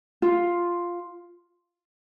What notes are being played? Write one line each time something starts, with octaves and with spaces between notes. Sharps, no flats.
F4